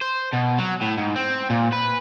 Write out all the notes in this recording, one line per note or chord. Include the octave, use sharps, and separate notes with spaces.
C5
B2
F#3
A2
G#2
C4
A#2
B4